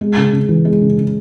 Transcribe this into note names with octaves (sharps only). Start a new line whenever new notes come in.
G#3
C#3
C#3
E3
G#3
C#3
C#3